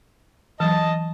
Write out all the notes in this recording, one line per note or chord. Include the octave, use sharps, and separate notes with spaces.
E3 F#3 D#5 A5